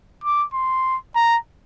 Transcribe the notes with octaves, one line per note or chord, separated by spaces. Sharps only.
D6
C6
A#5